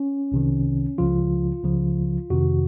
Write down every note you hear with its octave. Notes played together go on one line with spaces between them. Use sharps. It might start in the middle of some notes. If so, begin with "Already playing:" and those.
Already playing: C#4
C2 C3 D#3
C#2 C#3 F3 F4
C#2 C#3 F3
F2 C3 D#3 F#4